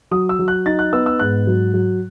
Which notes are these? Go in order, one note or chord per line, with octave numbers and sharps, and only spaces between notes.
F#3 D#6
E6
F#3
F#6
D#4 A6
F#6
B3 E6
E6
G#2 F#6
F#3
F#3